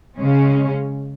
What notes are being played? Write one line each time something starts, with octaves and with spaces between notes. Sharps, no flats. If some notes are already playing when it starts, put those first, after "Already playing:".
C#3 G#3 C#4